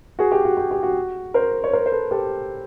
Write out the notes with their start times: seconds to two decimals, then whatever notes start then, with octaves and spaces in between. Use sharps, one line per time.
0.19 F#4 G#4
0.32 G4
0.45 F#4
0.57 G4
0.71 G4
0.83 F#4
1.34 A#4 C5
1.64 C#5
1.73 A#4 C5
1.86 C5
1.92 A4 B4
2.11 G4 A4